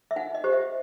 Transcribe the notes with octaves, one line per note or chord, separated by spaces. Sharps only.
E5
D#4 F#5
D#5
G4 C5
E5